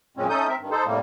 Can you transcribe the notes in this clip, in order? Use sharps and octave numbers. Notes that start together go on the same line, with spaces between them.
F#2 A#2 G#3 C4 C#4
A3 C#4 D#4 A4 D#6 G6
C4 A#4 E5
G2 D#3
D#4 A4 C5
A2 C3 G3 A#3